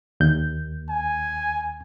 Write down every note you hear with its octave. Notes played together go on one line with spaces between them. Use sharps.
D#2 G6
G#5